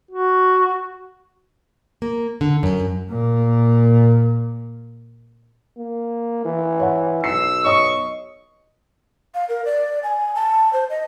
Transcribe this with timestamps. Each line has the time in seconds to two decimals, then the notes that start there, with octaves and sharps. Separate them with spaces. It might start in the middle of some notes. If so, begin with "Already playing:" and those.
0.11 F#4
2.02 A#3
2.41 D3
2.63 F#2
3.09 A#2 A#3
5.77 A#3
6.45 E3
6.79 C#5 F#5
7.24 B1 E6 C7
7.64 C#5 D#5 C#6 D#6
9.35 F5
9.49 A#4
9.65 D5
10.03 G#5
10.35 A5
10.73 C5
10.90 D#5